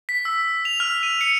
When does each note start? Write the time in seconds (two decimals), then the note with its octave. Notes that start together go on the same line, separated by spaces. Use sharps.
0.09 B6
0.25 E6
0.65 F7
0.80 F6
1.03 D#7
1.21 C#7